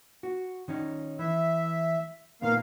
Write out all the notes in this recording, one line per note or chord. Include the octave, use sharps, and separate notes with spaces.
F#4
D#3 C#4 D#4
E3 E5
A#2 D#3 A#3 B3 F5